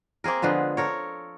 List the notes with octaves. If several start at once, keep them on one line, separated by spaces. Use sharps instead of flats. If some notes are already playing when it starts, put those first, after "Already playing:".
A#3 C4 G#4 A#4
D3 F3 G#3 B3
A4 A#4 C#5